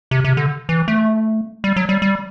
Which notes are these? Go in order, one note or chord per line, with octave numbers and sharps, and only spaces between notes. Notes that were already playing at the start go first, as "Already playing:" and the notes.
C3
C3
D3
E3
A3
G3
F#3
G3
G3